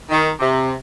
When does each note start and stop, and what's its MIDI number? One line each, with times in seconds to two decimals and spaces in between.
0.09 0.28 51
0.39 0.71 48